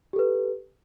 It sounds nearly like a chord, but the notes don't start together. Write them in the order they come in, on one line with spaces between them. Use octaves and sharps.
G4 A4 B4